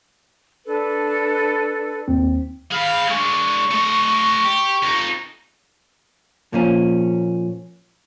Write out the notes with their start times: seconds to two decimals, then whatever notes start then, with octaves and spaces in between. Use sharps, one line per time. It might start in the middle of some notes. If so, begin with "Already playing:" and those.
0.65 D4 A4 B4
2.08 D#2 C4
2.72 G#4 F5 B5
3.10 G#3 D4 C#6
3.71 A3 D#5
4.45 G4
4.83 F2 D#4
6.53 A#2 F3 C#4